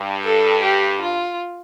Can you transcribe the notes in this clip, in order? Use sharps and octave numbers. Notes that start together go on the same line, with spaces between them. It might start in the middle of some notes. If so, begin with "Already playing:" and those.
Already playing: G2
A4
G4
F4